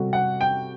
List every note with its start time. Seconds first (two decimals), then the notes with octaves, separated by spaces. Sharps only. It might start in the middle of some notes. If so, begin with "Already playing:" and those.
Already playing: C3 G3 C4 F#4 A4
0.13 F#5
0.41 G5